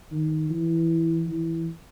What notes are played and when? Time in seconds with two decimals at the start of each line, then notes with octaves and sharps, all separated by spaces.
0.11 D#3
0.50 E3
1.27 E3